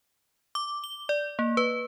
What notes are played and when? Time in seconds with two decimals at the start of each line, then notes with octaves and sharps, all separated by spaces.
0.55 D6
0.84 G7
1.09 D5
1.39 A#3
1.57 B4